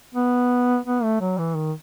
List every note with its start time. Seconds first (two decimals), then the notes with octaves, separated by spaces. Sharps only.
0.14 B3
0.86 B3
1.03 A3
1.21 F#3
1.39 E3
1.56 D#3